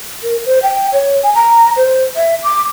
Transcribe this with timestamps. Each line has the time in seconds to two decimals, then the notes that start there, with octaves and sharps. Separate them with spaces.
0.23 A#4
0.45 C5
0.63 G5
0.92 C#5
1.23 G#5
1.34 A#5
1.76 C5
2.16 E5
2.43 D6